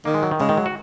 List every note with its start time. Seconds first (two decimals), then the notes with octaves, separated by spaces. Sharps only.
0.05 D#3 A#3
0.14 G#3
0.23 F#3
0.31 D#3
0.40 C#3 G#3
0.49 D#3
0.57 F#3
0.66 F#4